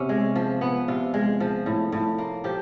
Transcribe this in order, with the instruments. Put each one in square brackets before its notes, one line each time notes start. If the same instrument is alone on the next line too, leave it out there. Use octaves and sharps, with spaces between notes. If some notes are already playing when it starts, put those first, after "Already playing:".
Already playing: [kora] C3 B3 C#4
G#3
F3
B3
C3 F4
G#3
F3
A2
A2
A#3
F3 G4